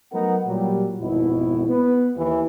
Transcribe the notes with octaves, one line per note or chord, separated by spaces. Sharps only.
F#3 A3 B3 D#4 A#4 F#5
A#2 F#3 G3
G#1 F2 B2 E4
B3 B4
D#2 E3